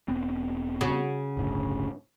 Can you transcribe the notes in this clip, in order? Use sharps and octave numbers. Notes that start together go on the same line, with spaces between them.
E1 B3 C4
C#3 F#4
D1 G1 D2